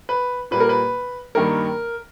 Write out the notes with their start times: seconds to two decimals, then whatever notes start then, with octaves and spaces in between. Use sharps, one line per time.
0.09 B4
0.51 A#2 G3 A#3 B4
0.60 A#4
0.69 B4
1.35 G2 D#3 G3 A#3 A#4